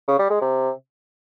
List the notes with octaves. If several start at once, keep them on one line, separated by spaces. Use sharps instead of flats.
C#3
G3
G#3
C3